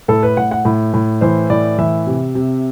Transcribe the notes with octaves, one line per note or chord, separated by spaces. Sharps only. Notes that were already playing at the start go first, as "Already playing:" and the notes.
A2 A4
B4
A2 F#5
F#5
A2
A2
E3 C5
A2 D5
E3 E5
C3
C3